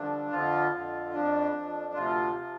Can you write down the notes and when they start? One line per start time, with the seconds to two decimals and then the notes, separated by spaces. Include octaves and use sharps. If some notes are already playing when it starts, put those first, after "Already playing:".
Already playing: G2 D3 F3 D4
0.30 F2 D3 F3 F4
0.72 F2 D3 F3
1.12 F2 F3 D4
1.53 F2 F3
1.94 D2 C3 F3 F4
2.35 C3 F3